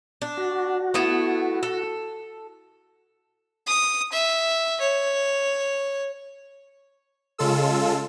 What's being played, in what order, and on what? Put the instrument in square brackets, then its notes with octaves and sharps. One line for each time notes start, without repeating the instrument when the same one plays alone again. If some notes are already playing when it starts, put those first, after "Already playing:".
[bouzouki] D4
[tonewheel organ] F#4
[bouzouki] A3 B3 E4
A4
[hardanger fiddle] D#6
E5
C#5
[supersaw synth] C#3 G#3 F4 A4 E6